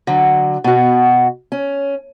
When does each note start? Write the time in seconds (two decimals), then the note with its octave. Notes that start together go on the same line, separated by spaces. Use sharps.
0.07 D3 F#3
0.64 B2 F#4
1.52 C#4